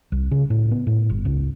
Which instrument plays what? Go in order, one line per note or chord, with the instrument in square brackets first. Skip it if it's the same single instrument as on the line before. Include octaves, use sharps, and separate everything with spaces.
[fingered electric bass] C2
C#3
A2
B3
A2
G1
C#2